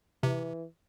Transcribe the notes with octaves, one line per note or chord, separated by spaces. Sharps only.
C3 E3